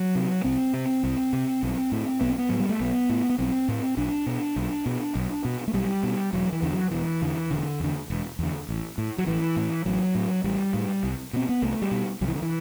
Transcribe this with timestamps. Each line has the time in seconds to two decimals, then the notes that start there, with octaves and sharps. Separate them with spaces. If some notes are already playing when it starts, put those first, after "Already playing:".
Already playing: F#3
0.15 C3
0.44 C2 C4
0.74 C3
1.03 C2
1.33 C3
1.63 B1
1.92 A2
2.21 B1 B3
2.29 C4
2.38 B3
2.49 A2 F#3
2.60 G3
2.69 A3
2.80 B1 B3
3.09 A2
3.30 B3
3.38 B1 C4
3.68 A2
3.97 B1 D4
4.26 B2
4.56 B1
4.86 B2
5.15 B1
5.45 B2
5.68 A3
5.73 B1 G3
6.03 B2
6.33 E1 F#3
6.52 E3
6.62 E2 D3
6.72 F#3
6.91 E1 E3
7.21 E2 D3
7.50 E1 D3
7.80 E2 D3
8.10 E1
8.39 E2 D3
8.69 A1
8.98 A2
9.18 F#3
9.27 A1 E3
9.56 A2
9.86 A1 F#3
10.15 A2
10.44 A1 G3
10.74 A2
11.03 C2
11.33 B2 C4
11.49 B3
11.62 C2 A3
11.82 G3
11.91 B2
12.21 C2 F#3
12.28 E3
12.36 D3
12.42 E3